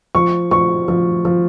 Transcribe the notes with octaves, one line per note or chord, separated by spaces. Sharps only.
F3 C#6
F3 C#6
F3
F3